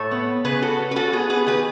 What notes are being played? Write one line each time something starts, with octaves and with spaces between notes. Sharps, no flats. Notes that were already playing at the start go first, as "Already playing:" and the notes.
Already playing: A2 A4 C#5
B3
C#3 G#4 B4
F#4 A4
C#4
B4
F#4 A4
B3 G#4
G#4 B4
D#3 G#4 B4